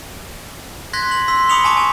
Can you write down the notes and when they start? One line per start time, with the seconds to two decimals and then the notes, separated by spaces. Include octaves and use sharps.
0.93 C6 F#6 G#6 A#6 B6
1.11 F#7
1.28 C6 E6 B6
1.49 B5 D6 D#6 C#7 F7 G7
1.64 G#5 A5 B5 C#6 D6
1.77 G#5